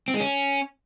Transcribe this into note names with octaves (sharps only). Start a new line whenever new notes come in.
C4
G#3
C#4